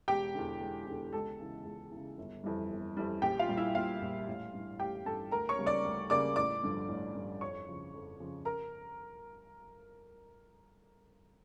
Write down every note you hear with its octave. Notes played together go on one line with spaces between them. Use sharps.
E1 G4 G5
E2 D3
E1
E2 D3
C#2 A4 A5
C#3 E3
C#2
C#3 E3
G1
F2 E3 G3
G1
F2 E3 G3
A#1 G4 G5
F4 F5
A#2 G3
E4 E5
A#1 F4 F5
A#2 G3
A1
G2 E3
A1 G4 G5
G2 E3 A4 A5
D2 A#4 A#5
C#5 C#6
C#3 G3 A#3
D5 D6
D2
C#3 G3 A#3 D5 D6
A1 D5 D6
G2 D3 F3
A1
G2 D3 F3
F2 C#5 C#6
C#3 F3
F2
C#3 F3
A#4 A#5